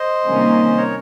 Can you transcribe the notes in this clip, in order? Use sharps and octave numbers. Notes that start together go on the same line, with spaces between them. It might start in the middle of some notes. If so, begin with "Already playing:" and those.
Already playing: C5 D#5
C3 D#3 G3 A#3 C#4
A#4 C#5